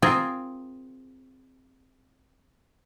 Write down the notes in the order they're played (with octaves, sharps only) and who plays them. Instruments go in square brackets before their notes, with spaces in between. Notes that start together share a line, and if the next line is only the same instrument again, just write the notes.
[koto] C4 F4 G#4 A#4